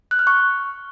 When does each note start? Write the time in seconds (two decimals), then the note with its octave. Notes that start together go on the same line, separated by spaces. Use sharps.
0.11 F#6
0.19 F6
0.27 C#6